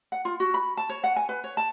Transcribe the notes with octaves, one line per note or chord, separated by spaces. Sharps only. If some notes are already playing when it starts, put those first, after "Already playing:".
F#5
F4
F#4
B5
A5
C#5
F#5
G#5
B4
C#5
A5